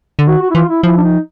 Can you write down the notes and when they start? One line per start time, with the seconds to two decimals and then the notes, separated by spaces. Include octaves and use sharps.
0.19 D3
0.27 D#3 F#4
0.42 F#4
0.50 E4
0.55 E3 F4
0.69 E4
0.83 F3 E4
0.97 D4
1.03 D#4